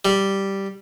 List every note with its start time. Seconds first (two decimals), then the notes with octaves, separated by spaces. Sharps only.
0.05 G3